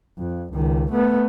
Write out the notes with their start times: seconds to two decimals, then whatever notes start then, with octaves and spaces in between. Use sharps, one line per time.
0.18 F2
0.54 C#2 D#3
0.92 A3 B3